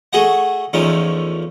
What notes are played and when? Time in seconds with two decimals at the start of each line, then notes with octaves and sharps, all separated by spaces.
0.13 A3 F#4 G#4 D#5 F#5
0.73 E2 F3 A3 C#4 D#4